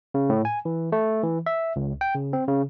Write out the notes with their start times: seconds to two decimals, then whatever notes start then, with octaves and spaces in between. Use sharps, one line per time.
0.14 C#3
0.30 A2
0.45 G#5
0.65 E3
0.92 A3
1.23 E3
1.46 E5
1.76 C#2
2.01 G5
2.15 C#3
2.33 C4
2.48 C#3